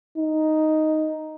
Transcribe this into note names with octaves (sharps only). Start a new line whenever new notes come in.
D#4